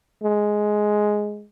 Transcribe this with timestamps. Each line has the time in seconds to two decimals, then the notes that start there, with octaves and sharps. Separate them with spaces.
0.23 G#3